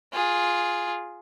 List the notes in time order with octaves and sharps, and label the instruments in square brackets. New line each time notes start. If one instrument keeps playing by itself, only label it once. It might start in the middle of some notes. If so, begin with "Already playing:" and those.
[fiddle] F4 G#4